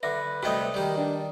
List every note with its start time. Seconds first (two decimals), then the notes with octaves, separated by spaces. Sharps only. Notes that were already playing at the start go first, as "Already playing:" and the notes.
0.03 D3 B4 E5 D6
0.43 C3 G3 A3 F#4 D#5 D#6
0.74 D#3 G3 G4
0.97 D4